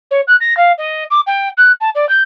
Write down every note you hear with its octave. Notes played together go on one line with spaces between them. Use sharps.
C#5
F#6
A#6
F5
D#5
D6
G5
F#6
A5
D5
G6